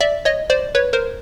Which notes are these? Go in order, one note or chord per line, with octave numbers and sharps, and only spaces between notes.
D5 E5
C#5 D#5
C5 D5
B4 C#5
A#4 C5